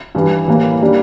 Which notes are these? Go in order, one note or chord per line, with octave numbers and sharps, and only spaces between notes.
G2 E3 G3
A2 E3 G3 A#3
D#3 G3 A#3 D4